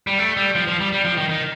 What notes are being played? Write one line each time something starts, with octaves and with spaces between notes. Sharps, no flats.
G3
A3
G3
F3
F3
G3
G3
F3
D#3
D#3